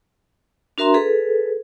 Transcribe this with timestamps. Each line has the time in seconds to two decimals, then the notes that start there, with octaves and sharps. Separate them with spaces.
0.78 D4 F#4 A#4 E5 A#5 C6
0.94 G#4 A4 B4